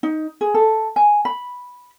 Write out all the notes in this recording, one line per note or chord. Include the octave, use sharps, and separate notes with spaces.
D#4
G#4
A4
G#5
B5